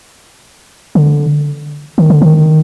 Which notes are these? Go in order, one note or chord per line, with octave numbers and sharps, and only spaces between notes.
D3
D#3
D3
D#3